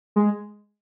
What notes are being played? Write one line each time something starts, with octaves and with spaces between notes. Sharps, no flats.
G#3